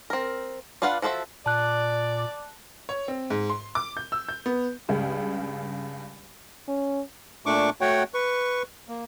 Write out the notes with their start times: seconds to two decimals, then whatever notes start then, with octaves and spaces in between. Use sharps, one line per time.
0.10 C4 A#4
0.82 D4 F4 B4 F5 F#5
1.02 F3 F#4 A4 C5 E5
1.46 A#2 D5 A5 F#6
2.89 C#5
3.08 C4
3.30 G#2
3.50 C6
3.75 D6
3.97 G6
4.12 E6
4.29 G6
4.46 B3
4.89 C#2 G2 C#3
6.68 C#4
7.46 A#2 A3 D4 C#6 D6
7.81 A3 F#4 C#5 F#5 G5
8.14 B4 C#6
8.88 A#3